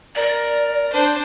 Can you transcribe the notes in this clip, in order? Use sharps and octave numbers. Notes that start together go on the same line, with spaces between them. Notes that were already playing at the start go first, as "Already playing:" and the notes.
A#4 D5
D4 C5